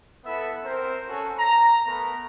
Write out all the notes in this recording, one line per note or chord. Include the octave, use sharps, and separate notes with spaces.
B3 E4 A4 E5
C4 A#4 C5
C#4 F#4 A4
A#5
A3 B3 A#4